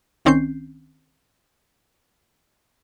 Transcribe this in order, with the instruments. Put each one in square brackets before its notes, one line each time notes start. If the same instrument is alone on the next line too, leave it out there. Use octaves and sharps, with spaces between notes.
[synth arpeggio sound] C2 D#3 C4 C#4 G6 C7